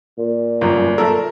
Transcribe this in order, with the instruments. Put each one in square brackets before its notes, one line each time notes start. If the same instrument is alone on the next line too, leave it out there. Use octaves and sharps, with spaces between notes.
[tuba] A#2
[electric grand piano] G1 [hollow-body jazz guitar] F#2 F4 A#5
[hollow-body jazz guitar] A4 E5 A5 [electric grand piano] A#4